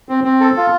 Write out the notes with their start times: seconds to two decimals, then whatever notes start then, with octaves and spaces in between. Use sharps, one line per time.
0.09 C4
0.24 C4
0.40 A4
0.57 F4